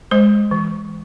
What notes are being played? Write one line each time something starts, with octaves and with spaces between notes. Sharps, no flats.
G#3 C5
E3